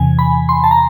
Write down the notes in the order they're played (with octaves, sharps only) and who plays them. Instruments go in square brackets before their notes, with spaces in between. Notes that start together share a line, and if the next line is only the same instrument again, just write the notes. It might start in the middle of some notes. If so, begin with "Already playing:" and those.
Already playing: [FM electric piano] E2 C3 E3 G#5
B5
C6
A5
A#5